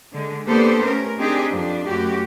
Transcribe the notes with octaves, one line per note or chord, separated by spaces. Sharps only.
D3 G#3
A#3 B3 D4 G4 A4 C5
A3 C#4 A#4
C4 D4 D#4 G4 G#4
F2 D4
F#2 A3 F#4 G4